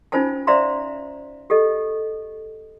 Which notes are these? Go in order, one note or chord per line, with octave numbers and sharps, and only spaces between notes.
C#4 D#4 F4 C5 G#5 A5
C5 D5 E5 F5 A#5 C6
G4 A4 D#5